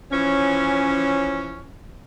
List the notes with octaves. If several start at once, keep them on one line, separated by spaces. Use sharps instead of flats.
E3 F3 C#4